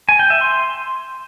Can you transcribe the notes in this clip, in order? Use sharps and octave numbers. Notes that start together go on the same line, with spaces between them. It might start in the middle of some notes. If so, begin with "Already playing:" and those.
G#5
G5
E5
C6